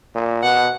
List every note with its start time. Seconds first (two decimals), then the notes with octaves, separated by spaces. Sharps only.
0.15 A#2
0.43 B2 F#5